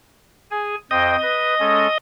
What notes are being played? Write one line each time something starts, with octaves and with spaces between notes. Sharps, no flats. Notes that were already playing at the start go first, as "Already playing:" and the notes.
G#4 G#5
F2 C5 D#5 G5
B4
G#3 C#4 A4